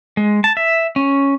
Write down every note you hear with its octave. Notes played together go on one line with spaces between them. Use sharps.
G#3
A5
E5
C#4